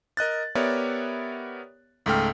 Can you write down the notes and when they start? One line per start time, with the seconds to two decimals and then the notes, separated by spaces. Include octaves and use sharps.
0.17 A#4 D#5 F#6 A6
0.55 B3 G4 A#4 C#5 D5 E5
2.06 C#2 G#2 A3 A4 G5 F6